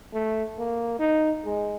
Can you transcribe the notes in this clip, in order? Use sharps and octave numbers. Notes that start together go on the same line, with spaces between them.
A3
A#3
D#4
G#3